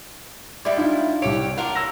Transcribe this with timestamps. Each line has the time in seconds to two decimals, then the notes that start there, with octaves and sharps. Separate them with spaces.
0.65 G3 G#3 E4 D5
0.77 D4 D#4 F4
1.22 C2 G4 C#5 D7
1.57 D4 F4 A#4 F#5
1.75 E6 A#6